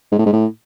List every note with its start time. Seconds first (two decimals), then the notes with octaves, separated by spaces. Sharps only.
0.12 G#2
0.19 A2
0.26 G#2
0.33 A2